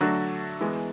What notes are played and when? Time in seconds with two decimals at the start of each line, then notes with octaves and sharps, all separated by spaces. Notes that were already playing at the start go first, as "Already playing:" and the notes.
0.01 D3 F#3 A3 D4 F#4
0.61 E3 G#3 B3